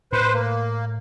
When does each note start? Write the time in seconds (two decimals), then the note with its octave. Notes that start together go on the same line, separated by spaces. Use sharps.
0.13 A2 B4 C5
0.34 A#3